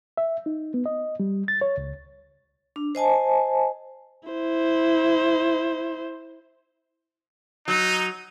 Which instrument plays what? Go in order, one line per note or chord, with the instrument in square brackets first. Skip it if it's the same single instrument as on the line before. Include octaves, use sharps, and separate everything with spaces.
[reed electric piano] E5
D#4
B3
D#5
G3
A6
C#5
C#2
[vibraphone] D4
C5 D#5 G#5 A5
[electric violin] E4 C5
[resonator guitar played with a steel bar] F#3 [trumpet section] D#4